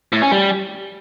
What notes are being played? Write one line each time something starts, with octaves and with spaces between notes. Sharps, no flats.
A2
C#4
G3